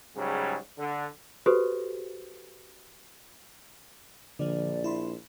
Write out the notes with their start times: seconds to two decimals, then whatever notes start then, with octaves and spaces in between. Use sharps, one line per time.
0.17 G#2 C#3 F#3 G3
0.79 D3
1.46 F#4 G4 A4 B4 C5
4.39 A#1 D3 F3 D5
4.84 E4 B5 C6